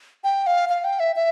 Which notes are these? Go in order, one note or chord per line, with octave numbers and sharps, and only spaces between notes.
G5
F5
F5
G5
E5
E5